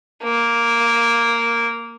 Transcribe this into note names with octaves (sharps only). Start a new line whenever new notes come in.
A#3